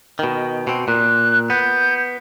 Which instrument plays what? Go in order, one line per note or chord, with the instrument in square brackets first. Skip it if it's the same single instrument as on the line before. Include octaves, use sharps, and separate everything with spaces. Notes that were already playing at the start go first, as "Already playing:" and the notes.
[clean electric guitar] B2 D#3
B2 C4
[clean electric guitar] A#2 [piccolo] F#6
[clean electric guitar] B3 [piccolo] G6